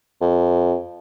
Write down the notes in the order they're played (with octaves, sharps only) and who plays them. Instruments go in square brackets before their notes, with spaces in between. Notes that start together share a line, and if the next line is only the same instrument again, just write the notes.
[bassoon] F2